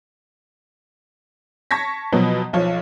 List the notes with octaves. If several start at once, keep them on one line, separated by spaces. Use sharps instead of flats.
A5 C#6 G#6 A#6 B6
B2 F3 F#3 B3
B1 F3 C#5